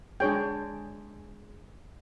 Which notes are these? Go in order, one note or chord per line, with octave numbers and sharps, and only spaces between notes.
G#3 D4 G#4 C#5 G5